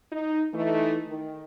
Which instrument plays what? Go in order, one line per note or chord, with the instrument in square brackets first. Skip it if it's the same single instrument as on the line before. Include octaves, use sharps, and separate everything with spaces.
[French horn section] D#4
E3 A3 D#4
D#3